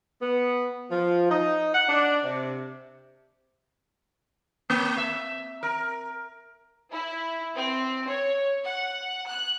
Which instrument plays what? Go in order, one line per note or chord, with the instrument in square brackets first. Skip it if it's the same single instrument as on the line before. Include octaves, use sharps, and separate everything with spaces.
[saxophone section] B3
F3
D#4
F#5
D4
C3
[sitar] A#3
E5
A#4
[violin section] E4
C4
C#5
F#5
F#6